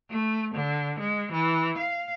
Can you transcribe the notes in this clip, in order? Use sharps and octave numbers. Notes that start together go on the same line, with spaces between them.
A3
D3
G#3
E3
F5